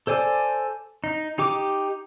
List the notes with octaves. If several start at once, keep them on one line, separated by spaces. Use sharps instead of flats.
A4 C5 D5 G#5
D#4
D#4 G4 D6